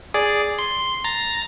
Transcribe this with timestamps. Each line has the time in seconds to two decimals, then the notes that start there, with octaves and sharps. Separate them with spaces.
0.14 G#4 D5
0.59 C6
1.04 A#5 A6 A#6